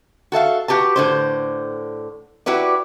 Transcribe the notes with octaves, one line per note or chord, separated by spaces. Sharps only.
F#4 A4 E5 F5
F#4 G4 B4 A5
A2 D3 C5
E4 F#4 G4 B4 D5